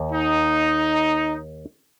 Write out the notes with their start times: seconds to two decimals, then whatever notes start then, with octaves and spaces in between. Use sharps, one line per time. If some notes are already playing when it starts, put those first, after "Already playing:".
Already playing: D#2
0.11 D#4